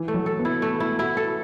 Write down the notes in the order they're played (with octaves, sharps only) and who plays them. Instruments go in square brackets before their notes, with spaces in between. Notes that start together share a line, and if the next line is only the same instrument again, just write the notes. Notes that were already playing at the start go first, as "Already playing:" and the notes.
Already playing: [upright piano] E3
[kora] A3
[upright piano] F#3
[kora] A4
[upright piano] B3
[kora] E4
A3
E4
[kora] E4 [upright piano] F#4
[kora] A4